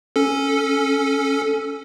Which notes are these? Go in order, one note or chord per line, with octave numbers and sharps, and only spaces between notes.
C#4 A4